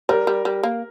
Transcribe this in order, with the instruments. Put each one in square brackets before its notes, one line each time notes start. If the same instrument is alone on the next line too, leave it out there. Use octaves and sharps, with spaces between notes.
[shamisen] G3 [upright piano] A#4
[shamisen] G3
G3
A#3